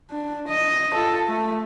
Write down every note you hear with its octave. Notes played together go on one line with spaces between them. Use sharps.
D4
D#5
F4 A4
A3